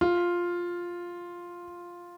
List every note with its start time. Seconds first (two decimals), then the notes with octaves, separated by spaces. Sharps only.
0.01 F4